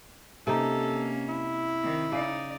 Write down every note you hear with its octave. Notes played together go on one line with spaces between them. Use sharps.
C3 A#3 C#4 D#4 A4
E4
D#3 C4
C#3 D#4 D5